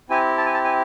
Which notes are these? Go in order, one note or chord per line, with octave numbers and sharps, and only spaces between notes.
C4 E4 G4 G#5
A5
G#5
A5
G#5